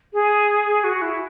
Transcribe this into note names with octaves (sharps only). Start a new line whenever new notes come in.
G#4
F#4
E4